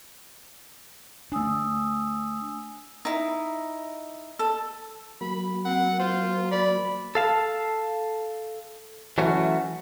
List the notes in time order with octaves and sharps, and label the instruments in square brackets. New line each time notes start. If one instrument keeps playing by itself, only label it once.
[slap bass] A3 D4 [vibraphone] G#5 D#6 E6
[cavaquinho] D#4 E4
A4
[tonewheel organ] F#3 A#3 [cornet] B5
[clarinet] C4 [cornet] F#5
[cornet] F4 [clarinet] C5
[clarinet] D5 [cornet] B5
[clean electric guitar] A4 F5 A5
E3 F#3 A3 C#4 F#4